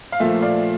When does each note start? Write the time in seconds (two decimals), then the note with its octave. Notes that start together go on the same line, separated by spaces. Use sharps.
0.12 F5
0.20 A#2 F3 A3 E5
0.42 D5 F5